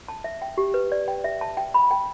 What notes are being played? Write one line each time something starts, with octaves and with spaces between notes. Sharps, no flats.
A5
E5
G5
G4
B4
D5
G5
E5
A5
G5
B5
G5